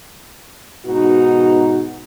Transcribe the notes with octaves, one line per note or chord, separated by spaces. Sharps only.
G#2 B2 B3 D#4 F#4